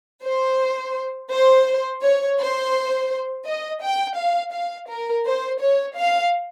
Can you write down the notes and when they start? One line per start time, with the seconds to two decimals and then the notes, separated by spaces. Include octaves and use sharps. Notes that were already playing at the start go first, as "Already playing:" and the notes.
0.24 C5
1.31 C5
2.02 C#5
2.39 C5
3.46 D#5
3.82 G5
4.17 F5
4.53 F5
4.88 A#4
5.25 C5
5.59 C#5
5.95 F5